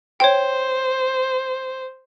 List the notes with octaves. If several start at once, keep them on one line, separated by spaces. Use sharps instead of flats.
C5 C#5 G5